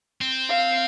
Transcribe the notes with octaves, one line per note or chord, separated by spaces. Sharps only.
C4
F5